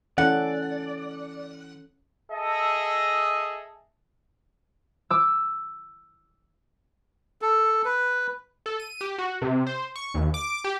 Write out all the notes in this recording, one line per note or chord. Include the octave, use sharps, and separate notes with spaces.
E3 C#4 A4 D5 F#5
G#4 A4 D#5 E5
D6 E6
A4
B4
A4
D#7
G4
F#4
C3
C5
C#6
D#2
D6
G4